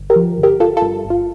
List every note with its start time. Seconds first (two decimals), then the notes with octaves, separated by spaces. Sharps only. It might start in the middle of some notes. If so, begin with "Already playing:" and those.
Already playing: G1
0.10 G4 A#4
0.16 F3
0.38 G1
0.43 G4 A#4
0.60 G1 F4 A4
0.77 F4 A4
0.82 G2
1.05 G1
1.10 F4